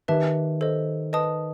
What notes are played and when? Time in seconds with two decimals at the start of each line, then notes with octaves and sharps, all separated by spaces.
0.08 D#3 G4 B4 E5 A5
0.61 A4 C5 D#5
1.13 B4 D#5 A5 D#6